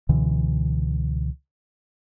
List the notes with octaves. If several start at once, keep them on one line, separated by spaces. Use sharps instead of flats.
C#2 B2 D3 E3